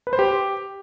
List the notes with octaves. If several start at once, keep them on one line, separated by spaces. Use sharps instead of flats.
B4
C5
G4